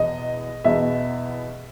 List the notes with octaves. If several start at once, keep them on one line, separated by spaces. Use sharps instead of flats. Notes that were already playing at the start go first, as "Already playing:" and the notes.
Already playing: E2 B2 D#5
E2 B2 E5